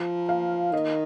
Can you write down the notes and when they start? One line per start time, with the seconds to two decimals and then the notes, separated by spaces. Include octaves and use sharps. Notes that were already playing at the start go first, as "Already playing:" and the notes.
Already playing: F3 A#5
0.29 F5
0.73 D#3 D#5